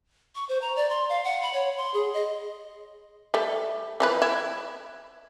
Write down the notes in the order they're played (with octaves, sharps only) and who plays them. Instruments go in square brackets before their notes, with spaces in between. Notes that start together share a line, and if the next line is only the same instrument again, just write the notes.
[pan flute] C#6
C5
A#5
D5
C6
F5
F#5
B5
C#5
C6
G#4
D#5
[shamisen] G3 A3
E3 F3 B4
E4